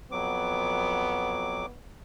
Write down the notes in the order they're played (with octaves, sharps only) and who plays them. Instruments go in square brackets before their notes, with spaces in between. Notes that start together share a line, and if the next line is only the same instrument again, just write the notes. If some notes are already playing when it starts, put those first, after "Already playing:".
[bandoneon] F2 F#3 D6 [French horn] B3